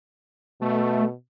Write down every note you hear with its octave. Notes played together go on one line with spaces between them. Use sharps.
B2 A3